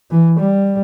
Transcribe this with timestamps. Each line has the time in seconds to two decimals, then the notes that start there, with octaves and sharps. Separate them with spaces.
0.11 E3
0.40 G3